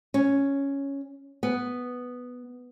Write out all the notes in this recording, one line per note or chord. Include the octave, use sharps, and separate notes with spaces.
C#4
B3